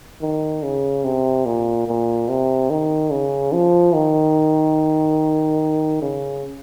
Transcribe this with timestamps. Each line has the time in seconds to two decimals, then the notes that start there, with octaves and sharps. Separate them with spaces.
0.21 D#3
0.63 C#3
1.04 C3
1.46 A#2
1.88 A#2
2.29 C3
2.70 D#3
3.12 C#3
3.53 F3
3.94 D#3
6.02 C#3